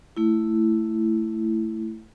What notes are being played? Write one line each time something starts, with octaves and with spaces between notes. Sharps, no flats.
A3 E4